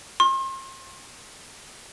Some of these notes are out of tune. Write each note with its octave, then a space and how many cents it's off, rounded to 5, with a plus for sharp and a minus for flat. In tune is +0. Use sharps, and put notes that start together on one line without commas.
C6 +40